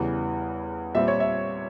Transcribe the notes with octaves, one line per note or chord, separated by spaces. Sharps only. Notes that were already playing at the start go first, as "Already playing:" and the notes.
Already playing: E2 C#3 E3 G3
A#2 G3 C4 F4 E5
C#5
E5